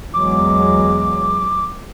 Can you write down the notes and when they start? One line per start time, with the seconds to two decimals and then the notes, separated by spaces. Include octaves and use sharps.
0.14 E2 F#3 G#3 D6